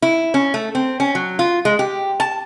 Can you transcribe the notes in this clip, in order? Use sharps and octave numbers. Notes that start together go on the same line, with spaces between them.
E4
C#4
A3
C4
C#4
F#3
F4
G#3
G4
A5